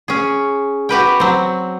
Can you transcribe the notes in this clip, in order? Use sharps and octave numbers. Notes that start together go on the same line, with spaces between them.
C#4 G#4
F#4 G4 B4 G5
F#3 C4